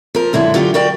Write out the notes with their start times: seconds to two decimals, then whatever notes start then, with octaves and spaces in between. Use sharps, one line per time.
0.15 F3 A#4
0.33 F#2 D3 G#3 E4
0.54 D3 F#3 F4 G4
0.74 F#4 A#4 D5 G5